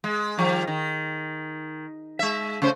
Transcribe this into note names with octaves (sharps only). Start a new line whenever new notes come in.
G#3
D#3 F3 G3
D#3
G#3 E5
C#3 A3 C5